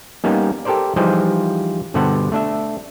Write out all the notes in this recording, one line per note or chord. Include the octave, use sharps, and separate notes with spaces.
G3 A#3 B3 C#4 D#4
G4 A4 A#4 C5 D5
E3 F3 G3 D#4 G#4 C5
G2 B2 D3 B3 C5 F#5
A3 D4 E5